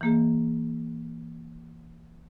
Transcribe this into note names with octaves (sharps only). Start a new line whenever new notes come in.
E3 A#3 G#4